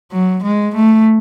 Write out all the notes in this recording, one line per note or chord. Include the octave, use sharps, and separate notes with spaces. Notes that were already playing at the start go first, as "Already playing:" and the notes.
F#3
G#3
A3